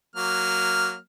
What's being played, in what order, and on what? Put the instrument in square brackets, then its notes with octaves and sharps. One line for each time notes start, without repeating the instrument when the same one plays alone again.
[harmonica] F#3 A#3 F6